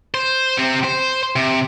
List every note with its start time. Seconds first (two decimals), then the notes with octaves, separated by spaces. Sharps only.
0.14 C5
0.57 C3 C4
0.84 C5
1.36 C3